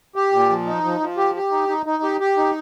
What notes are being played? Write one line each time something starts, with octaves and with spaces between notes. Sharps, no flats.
G4
A#2
F3
D#4
F3
F3
G4
G4
D#4
D#4
D#4
G4
G4
D#4